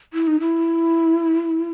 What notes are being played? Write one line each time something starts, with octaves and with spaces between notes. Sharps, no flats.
E4
D#4
E4